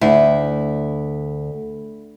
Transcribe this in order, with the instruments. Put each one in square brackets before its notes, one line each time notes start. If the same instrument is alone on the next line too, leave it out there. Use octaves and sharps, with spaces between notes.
[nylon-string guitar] D2 [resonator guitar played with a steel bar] E4